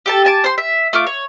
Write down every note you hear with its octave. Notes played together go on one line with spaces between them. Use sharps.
G4 A4 A5
G#5 A5 D6
C5 C6
E5
A3 F4 D6
C#5